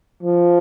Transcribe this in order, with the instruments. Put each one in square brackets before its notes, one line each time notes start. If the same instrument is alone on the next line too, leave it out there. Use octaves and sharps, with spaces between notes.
[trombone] F3